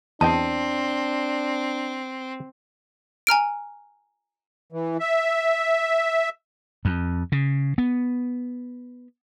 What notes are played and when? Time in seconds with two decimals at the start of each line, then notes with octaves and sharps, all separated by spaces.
0.21 E2 C4 D4 D#5 G5 A5
3.27 G#5 A#5 F6 D7
4.72 E3
5.00 E5
6.85 F2
7.32 C#3
7.78 B3